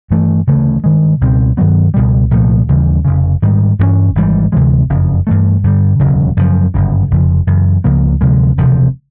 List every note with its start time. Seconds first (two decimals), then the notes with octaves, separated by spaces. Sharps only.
0.11 G2 E3 A3
0.47 D2 C#3 E3 A3
0.84 G2 D#3 G#3
1.21 C#2 B2 G3 C4
1.57 G2 D#3 F#3 B3
1.94 C#2 B2 G3
2.31 C2 A#2 F3 A3
2.69 D#2 C#3 E3 G3
3.05 F1 D#2 C#3
3.42 G#2 D#3 G3
3.79 G2 E3 A3 C#4
4.15 G#1 G#2 E3 G3
4.52 D2 C3 E3 G#3
4.89 F#1 F2 C#3
5.27 G2 E3 A3
5.64 G2 D3 G3
5.99 E1 D2 C#3 F#3
6.37 F#2 C#3 F3
6.74 G1 F#2 C#3
7.11 F1 F2 C#3 F3
7.47 F#2 C#3 E3
7.84 C#2 C#3 F3 A#3
8.21 D2 C3 F3 G#3
8.58 E1 D2 C3 F3